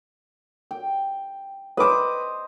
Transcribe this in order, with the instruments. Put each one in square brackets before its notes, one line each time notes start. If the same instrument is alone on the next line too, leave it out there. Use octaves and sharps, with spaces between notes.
[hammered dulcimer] G5
[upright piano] B4 D6 [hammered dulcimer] C5 D#5